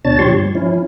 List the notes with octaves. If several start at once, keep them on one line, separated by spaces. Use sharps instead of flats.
D2 B2 D4 C#5 A5 A6
A#2 F3 G4 C#5 C6 C#6
G2
F3 C#4 E4